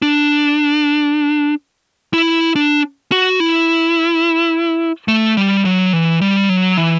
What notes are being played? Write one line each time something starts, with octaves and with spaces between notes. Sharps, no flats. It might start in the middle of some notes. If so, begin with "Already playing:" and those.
D4
E4
D4
F#4
E4
A3
G3
F#3
E3
G3
F#3
E3